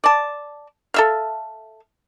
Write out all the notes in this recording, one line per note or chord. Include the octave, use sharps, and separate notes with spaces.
D5 A5
A4 E5 F5